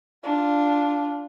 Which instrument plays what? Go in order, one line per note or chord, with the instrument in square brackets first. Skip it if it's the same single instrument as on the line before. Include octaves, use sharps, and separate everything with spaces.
[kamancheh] D4 F4